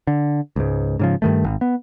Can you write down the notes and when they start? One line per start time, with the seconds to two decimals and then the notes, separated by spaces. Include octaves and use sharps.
0.07 D3
0.56 C#2 G#2
0.99 G#2 C#3 F3
1.22 G2 D#3 A3
1.44 G#1
1.61 B3